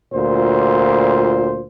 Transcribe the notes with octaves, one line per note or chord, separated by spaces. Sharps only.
D2 A#2 F4 C5